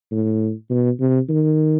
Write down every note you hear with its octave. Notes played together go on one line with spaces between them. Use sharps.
A2
B2
C3
D#3